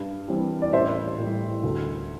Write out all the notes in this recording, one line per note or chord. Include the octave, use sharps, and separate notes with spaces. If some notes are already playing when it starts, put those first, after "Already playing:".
Already playing: G2
E3 G3 C4
D5
A1 C5 E5
A2 G3
D2